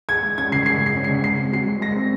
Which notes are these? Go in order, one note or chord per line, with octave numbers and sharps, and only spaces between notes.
G#4 G#6
G#3
C#4 G#6
C#3 C7
G#4 C7
G#3
C7
C#4
C7
C#3
G#3 C7
C4
F#4 C7
G#3
G#3 A#6
C4